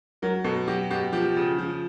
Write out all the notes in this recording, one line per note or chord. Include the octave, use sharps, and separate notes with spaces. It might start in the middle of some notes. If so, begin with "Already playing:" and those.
F#3 A#4
B2 A4
F#3 G4
B2 G4
F3 G4
C#3
F3